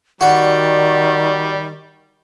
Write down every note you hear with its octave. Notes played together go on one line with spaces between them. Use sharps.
D#3 G3 F#4 D5